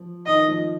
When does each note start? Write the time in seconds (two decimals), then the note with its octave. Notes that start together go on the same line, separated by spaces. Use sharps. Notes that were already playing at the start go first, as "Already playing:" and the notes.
Already playing: F3
0.26 D#3 D#5
0.48 F3